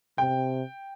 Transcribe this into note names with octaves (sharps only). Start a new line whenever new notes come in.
C3 G5